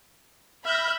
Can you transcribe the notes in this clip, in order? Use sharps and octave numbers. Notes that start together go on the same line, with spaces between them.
E5 B5 F6 G6 A#6